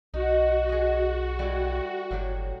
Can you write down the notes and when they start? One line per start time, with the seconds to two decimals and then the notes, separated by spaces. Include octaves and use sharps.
0.14 B1 D#4 F#4
0.69 G#4 D#5
1.39 G3 A3 E4
2.11 G1 A2 F#3 G4